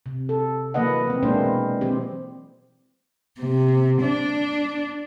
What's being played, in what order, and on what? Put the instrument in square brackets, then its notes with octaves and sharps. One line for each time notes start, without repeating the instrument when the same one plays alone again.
[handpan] C3
A4
E3 F#3 A#3 B4 D#5 F#5
E3 C4
B2 G#3 A#3 D4 E4 C5
E3 F#3 C4 G4
[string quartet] C3
D4